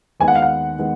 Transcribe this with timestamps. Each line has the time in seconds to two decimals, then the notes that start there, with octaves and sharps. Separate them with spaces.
0.20 D#2 D#3 G#3 B3 G#5
0.28 F#5
0.35 F5
0.42 F#5
0.79 D#3 G#3 B3